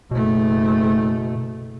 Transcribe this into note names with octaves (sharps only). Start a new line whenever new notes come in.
F#1 B2 A3